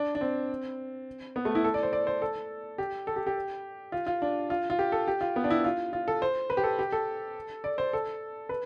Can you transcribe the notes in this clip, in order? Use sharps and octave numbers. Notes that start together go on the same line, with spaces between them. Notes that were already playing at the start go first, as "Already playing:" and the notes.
Already playing: D4
D4
C4
B3
A3
E4
A4
D5
C5
D5
C5
A4
G4
A4
G4
G4
F4
F4
D4
F4
F4
G4
A4
G4
F4
B3
D4
E4
F4
F4
A4
C5
B4
G4
A4
G4
A4
D5
C5
A4
B4